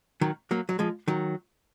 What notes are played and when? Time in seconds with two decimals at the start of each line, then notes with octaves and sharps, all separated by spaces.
0.21 D#3 F#3
0.51 F#3 A#3
0.69 F#3
0.79 F3 G#3
1.08 D#3 F#3